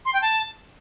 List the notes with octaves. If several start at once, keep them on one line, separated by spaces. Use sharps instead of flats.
C6
G5
A5